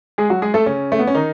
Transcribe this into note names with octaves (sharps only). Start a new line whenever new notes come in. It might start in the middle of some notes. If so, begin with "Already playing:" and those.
G#3 G#4
F#3 F#4
G#3 G#4
A3 A4
C#3 C#4
A3
B3
C#4
D#3 D#4